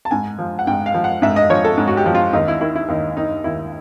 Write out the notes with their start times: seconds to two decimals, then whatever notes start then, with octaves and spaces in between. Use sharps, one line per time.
0.05 A5
0.11 G#2 G#5
0.38 F3
0.59 F#5
0.67 G#2 G5
0.86 F5
0.94 F3
1.04 F#5
1.22 G#2 E5
1.36 D#5
1.50 F3 C#5
1.64 A4
1.77 G#2
1.87 F#4
1.97 G4
2.06 F3
2.15 F4
2.33 D#2 D#4
2.48 E4
2.61 D#3 E4
2.75 E4
2.89 D#2 D#4
3.17 D#3 D#4
3.44 D#2 E4